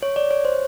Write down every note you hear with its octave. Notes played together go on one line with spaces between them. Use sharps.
C#5
D5
C#5
C5